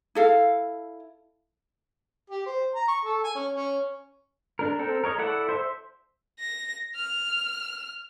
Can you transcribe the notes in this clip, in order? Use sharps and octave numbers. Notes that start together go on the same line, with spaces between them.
E4 A4 F5
G4
C5
A#5
C#6
A4
G#5
C#4
C#4
D4 A#4
C4 A4 A#4
A#4 C#5 D#5
E4 A4 D5 F#5
C5 E5
A#6
F6